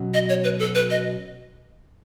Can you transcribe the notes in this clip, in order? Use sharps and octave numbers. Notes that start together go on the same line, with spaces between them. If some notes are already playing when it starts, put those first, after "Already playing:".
Already playing: B2 F#3 C#4
D#5
C#5
B4
A4
B4
D#5